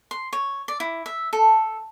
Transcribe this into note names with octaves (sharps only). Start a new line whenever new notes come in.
C6
C#5
D5
E4
E5
A4